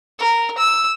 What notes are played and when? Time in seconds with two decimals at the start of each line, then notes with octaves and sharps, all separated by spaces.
0.19 A#4
0.58 E6